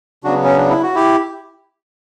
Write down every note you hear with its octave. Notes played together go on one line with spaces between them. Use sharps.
C#3 F#3 B3 D4 F#4
C#4
D4
E4
F#4
E4 G4